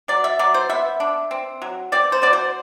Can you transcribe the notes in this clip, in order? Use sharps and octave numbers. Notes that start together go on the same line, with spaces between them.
F#3 D5
E5
F#3 D5
C5
B3 E5
D4
C4
F#3
C4 D5
C5
F#3 D5
C5